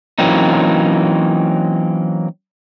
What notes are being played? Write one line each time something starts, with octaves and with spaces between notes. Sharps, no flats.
E3 F#3 A#3 C4 C#4 D#4